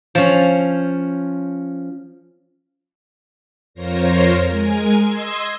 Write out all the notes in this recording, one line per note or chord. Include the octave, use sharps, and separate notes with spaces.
F3 C#4
F2 F4 A#4 C5 C#5 A#6
G#3 A#4 G#5 G#6
D#5 C6 E6 G#6